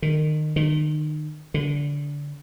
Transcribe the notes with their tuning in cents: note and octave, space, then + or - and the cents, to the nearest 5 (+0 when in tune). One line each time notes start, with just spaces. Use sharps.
D#3 -25
D#3 -35
D3 -25